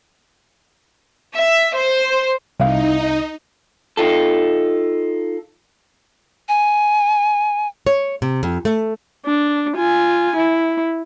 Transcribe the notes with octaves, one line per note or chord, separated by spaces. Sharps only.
E5
C5
C2 D#4 E4 F5
D#4 F4 A4
G#5
C#5
C3
F2
A3
D4
F4 G#5
E4